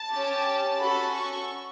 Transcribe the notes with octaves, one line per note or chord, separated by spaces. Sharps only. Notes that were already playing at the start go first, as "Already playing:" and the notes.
Already playing: A5
C#4 G4
C#4 F#4 A4 B5
C#6